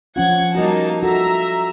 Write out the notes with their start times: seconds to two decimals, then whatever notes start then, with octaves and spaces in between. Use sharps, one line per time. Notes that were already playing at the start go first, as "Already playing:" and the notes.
0.16 F3 C#4 F4 F#5 G#6
0.55 G3 A#3 D#4 F#4 A5
1.03 F4 F#4 A4 E5 A#5 E6